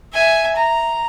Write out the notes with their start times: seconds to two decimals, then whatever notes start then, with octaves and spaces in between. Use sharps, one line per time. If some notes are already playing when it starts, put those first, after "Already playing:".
0.13 E5 G#5
0.56 A#5